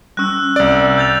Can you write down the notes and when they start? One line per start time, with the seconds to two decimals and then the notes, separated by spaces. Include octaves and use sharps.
0.17 G3 C#4 E6 F#6
0.56 C2 D5
0.98 G6 A6 F7